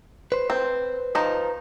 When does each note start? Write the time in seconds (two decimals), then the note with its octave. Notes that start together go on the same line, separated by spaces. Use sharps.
0.32 B4 C5
0.50 C4
1.15 D#3 F3 D#4